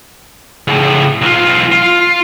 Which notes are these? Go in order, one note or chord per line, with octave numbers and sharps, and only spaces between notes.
A2 C#3
B1 F4
F4